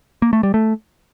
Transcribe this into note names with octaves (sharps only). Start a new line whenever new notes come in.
A#3
A3
G3
A3